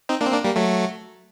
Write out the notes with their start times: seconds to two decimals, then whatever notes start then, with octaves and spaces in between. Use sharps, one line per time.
0.09 C4 D#4
0.21 A#3 D4
0.27 C4
0.32 A#3 D4
0.45 G3 A#3
0.56 F#3 A3